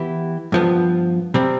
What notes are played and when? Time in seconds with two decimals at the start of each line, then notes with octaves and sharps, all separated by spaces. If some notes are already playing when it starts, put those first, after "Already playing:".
Already playing: E3 B3 E4 G4
0.52 G2 F3 B3
1.34 C3 G3 C4